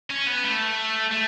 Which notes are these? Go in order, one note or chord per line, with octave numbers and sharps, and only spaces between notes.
C#4
B3
A3
A3